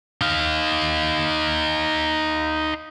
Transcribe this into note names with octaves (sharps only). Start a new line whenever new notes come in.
D#4 F5